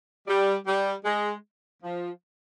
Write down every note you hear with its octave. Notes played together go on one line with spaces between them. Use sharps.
G3
G3
G#3
F3